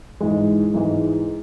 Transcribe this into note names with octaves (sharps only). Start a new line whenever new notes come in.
G#2 E3 G#3
G#2 E3 G#3